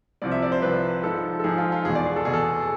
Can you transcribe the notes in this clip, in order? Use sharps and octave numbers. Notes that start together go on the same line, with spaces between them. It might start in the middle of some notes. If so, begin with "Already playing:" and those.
C2 C3 F3 D5
E5
D5
C5
C2 C3 F3 B4
G#2 F3 A4
A4
G#2 F3 G#4
F4
F4
E2 B2 G#4
D5
G#4
A4
E2 B2 G#4
A4